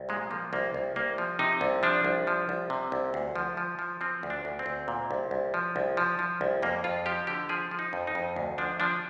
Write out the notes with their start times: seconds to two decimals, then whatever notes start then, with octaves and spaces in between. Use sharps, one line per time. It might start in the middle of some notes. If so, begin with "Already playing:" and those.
Already playing: C2
0.09 A#2 G#3
0.31 F3 A#3
0.53 C2 A#3
0.74 C2
0.96 C2 A#3
1.18 F3
1.39 C3 D#4
1.61 C2
1.83 F3 D4
2.05 C2
2.27 F3
2.49 C2
2.70 C3
2.92 C2
3.14 D2
3.36 F3
3.57 F3
3.79 F3
4.01 F3 C4
4.23 D2
4.30 D4
4.45 D2
4.59 C4
4.66 D2
4.88 A#2
5.11 C2
5.31 C2
5.54 F3
5.76 C2
5.97 F3
6.19 F3
6.41 C2
6.62 F2 A#3
6.84 F2 F4
7.06 F3 G4
7.27 D3 G4
7.49 F3 G#4
7.71 F3
7.79 D#4
7.93 F2
8.07 D#4
8.15 F2
8.36 D2
8.58 F3 D4
8.80 F3 D4